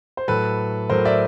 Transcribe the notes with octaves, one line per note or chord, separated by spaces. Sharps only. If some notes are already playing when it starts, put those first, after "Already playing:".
C5
A2 F#3 A4 B4
A2 F#3 A#4 C5
D5 E5